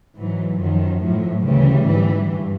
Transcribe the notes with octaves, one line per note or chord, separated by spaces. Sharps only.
G#2 E3 F#3
F#2 D#3 F3
A2 F3 F#3
D2 C#3 E3 G3
G#2 E3
G2